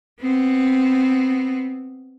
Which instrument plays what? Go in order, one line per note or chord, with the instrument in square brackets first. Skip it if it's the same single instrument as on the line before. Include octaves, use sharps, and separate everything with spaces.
[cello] B3 C4